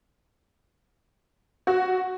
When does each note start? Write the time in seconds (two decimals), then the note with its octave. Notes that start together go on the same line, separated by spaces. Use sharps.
1.67 F#4